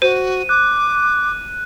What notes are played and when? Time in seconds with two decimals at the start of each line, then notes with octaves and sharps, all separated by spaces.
0.02 F#4 C5 D#7
0.49 D6 F#6